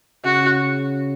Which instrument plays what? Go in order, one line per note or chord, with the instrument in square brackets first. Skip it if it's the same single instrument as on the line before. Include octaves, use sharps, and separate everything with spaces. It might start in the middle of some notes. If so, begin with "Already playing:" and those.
[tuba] C#3 [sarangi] F#4